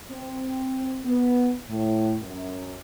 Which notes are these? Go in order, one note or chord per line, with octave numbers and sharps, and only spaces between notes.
C4
B3
A2
F#2